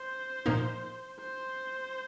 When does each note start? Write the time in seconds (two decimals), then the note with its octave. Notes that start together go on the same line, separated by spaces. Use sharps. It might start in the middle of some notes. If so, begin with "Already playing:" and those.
Already playing: C5
0.46 A#2 F3 A#3 D#4
1.20 C5